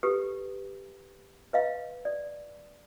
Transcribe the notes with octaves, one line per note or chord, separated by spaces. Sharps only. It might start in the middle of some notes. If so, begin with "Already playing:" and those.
G4 A4 B4
B4 D#5 F5
D5